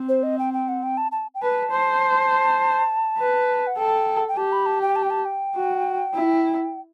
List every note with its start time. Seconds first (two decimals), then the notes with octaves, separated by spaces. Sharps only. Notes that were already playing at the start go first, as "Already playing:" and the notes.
Already playing: C4
0.09 C5
0.23 D#5
0.39 G5
0.54 G5
0.68 F#5
0.83 G5
0.97 A5
1.12 A5
1.35 G5
1.42 B4 A5
1.71 C5
3.19 B4
3.67 F#5
3.77 A4 G5
4.28 G5
4.37 G4 A5
4.52 B5
4.66 A5
4.82 G5
4.96 A5
5.03 G5
5.10 A5
5.25 G5
5.56 F#4
6.14 E4